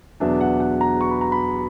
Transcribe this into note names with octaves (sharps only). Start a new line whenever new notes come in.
E2 B2 F#3 B3 D4 E5
F#5
F#5
A#5
C#6
B5
A#5
B5